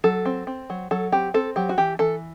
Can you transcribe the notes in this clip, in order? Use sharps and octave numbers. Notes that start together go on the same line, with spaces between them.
F#3 A4
C4
C4
F#3
F#3 A4
C4 G4
C4 A4
F#3 G4
F#4
E3 G4
E3 A4